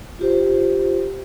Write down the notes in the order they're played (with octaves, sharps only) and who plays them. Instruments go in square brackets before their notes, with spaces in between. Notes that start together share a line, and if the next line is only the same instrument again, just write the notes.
[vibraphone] F4 G4 C5